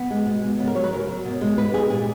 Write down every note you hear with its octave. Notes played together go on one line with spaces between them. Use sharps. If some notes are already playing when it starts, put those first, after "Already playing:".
Already playing: B3
G#3
B2
G#3
C#3 B3
A#4
F#3 C#5
B4
C#3 A#4
F#3
B2
G#3
B2 B4
G#3 G#4
A#2 G#4